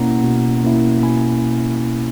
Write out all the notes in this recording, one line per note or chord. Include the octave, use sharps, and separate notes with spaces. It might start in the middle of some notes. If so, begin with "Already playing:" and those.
Already playing: B2 A#3 C#4 E4 F#5 A#5
B2
A#3 C#4 E4
B2 G#5 B5